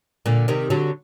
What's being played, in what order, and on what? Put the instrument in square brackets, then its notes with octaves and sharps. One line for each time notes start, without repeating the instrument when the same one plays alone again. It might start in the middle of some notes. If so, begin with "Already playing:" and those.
[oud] A#2 D3
C3 D#3
D3 F#3